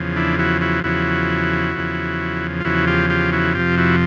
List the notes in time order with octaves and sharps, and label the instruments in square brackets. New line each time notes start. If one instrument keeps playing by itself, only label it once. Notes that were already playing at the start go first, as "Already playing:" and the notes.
Already playing: [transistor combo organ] E2 C#3 F3
D4 E4
E4 F#4
E4 F#4
E2 C#3 F3 E4 F#4
E2 C#3 F3
F4
E2 C#3 F3 E4 F#4
F4 G4
F4 G4
E4 F#4
F2 C3 F3 F4 G4
E4 F#4